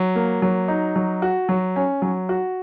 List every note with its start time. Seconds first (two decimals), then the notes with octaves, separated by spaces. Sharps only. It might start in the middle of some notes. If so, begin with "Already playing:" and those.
Already playing: F#3
0.16 A#3
0.42 F#3
0.68 D#4
0.96 F#3
1.22 F#4
1.49 F#3
1.76 C#4
2.02 F#3
2.29 F#4